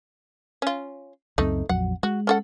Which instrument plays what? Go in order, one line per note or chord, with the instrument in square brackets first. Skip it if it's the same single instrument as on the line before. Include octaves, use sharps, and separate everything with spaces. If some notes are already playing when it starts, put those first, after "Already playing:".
[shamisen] C#4 F4
[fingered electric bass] C#2 F#2 C4 [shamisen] A3 D#4
[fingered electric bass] A#1 F2 F#3 [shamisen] F#5
[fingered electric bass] G#3 [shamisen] F#4
[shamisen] C#4 A4 F#5